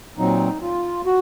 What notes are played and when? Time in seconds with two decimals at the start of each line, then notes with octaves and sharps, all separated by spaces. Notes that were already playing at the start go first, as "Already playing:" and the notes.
0.18 A#2 F#3 C4 D#4
0.62 F4
1.06 F#4